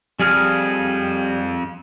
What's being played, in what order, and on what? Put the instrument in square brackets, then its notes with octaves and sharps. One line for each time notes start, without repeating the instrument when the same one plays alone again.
[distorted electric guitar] F2 [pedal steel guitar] G3 G#4 F6